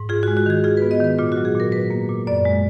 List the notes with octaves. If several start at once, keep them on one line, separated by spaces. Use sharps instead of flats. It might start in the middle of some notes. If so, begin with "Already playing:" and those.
Already playing: G#2
F4 G#4
F#4
G#3
F#4
D#3 G#4
F4 G#4
B4
B3
D#5
D#3 B4
A#2 F4
F#4
F#3
G#4
A#2 A#4
F#3 B4
A#3
A#2
F#2 D5
G#3